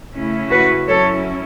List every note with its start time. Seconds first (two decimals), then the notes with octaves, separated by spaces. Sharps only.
0.14 C#3 A3 C#4 E4
0.50 F#4 B4
0.87 F#2 F#3 C#4 E4 A4 C#5